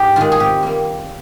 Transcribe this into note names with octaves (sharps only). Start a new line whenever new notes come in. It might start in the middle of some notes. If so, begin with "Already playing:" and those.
Already playing: G#2 G4
D#3 G#3 F4
G#4
C3 G4
G3 A#3